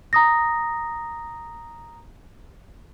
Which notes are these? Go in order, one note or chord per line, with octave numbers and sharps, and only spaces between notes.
A#5 D#6 A#6